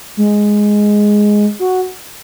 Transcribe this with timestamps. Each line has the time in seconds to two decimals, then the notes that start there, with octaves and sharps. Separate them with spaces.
0.17 G#3
1.60 F#4